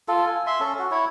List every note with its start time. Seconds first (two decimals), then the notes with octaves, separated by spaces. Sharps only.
0.08 F4 A4
0.27 G#5
0.47 E5 C6
0.60 C#4 A4
0.79 F#4
0.91 E4 C#5